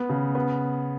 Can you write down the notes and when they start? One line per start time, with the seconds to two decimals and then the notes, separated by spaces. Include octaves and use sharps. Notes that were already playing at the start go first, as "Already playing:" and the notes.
Already playing: B3
0.09 C#3
0.35 B3